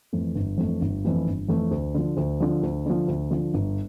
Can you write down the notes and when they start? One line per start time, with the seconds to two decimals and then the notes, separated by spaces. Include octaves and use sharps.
0.13 F2 E3 A3
0.35 G1
0.58 F2 E3 A3
0.81 G1
1.04 F2 E3 A3
1.26 G1
1.48 F2 E3 A3
1.71 D2
1.94 D3 F3
2.17 D2
2.40 D3 F3
2.63 D2
2.86 D3 F3
3.08 D2
3.30 D3 F3
3.54 G1